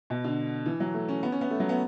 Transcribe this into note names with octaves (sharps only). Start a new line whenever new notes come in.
B2
D3
E3
F#3
A3
C#4
B3
C#4
B3
A3
F#3
B3